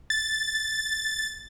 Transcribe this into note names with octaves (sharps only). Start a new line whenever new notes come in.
A6